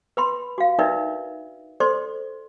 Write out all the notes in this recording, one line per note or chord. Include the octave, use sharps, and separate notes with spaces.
B4 B5 C6
F#4 F5
D4 D#4 A#4 B4 D5 E5
A4 C5 D5 C6